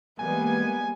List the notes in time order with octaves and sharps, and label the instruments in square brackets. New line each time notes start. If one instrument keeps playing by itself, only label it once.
[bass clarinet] E3 [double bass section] G3 G#3 A#3 [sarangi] B3 [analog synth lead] G#5